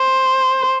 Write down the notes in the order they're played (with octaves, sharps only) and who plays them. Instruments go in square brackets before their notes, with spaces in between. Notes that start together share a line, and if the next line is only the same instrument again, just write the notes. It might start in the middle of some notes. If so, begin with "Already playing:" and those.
Already playing: [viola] C5